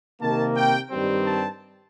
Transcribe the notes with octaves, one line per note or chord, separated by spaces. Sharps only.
C3 D#3 A#3 A5
G5
G2 D#3 G3 C4
A5